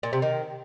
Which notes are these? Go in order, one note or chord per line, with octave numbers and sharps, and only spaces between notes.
A#2
C3
D#3